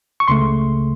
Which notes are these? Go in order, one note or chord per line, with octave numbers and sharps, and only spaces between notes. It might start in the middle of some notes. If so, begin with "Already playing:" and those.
C#6
C#2 C#3 A3 C6